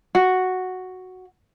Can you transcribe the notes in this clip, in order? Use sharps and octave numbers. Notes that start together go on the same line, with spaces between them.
F#4